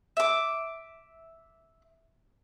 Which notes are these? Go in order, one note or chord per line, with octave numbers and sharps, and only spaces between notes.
E5 D6